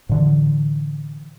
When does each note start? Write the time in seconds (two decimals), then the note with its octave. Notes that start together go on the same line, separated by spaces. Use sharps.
0.09 A2 D3 E3